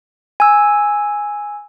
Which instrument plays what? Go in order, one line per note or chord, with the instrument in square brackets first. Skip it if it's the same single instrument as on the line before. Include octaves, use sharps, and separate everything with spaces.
[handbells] G#5 E6